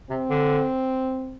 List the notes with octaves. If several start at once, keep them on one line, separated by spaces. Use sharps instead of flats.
C3 C4
D3